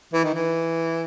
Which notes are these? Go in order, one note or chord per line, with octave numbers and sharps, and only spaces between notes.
E3
D#3
E3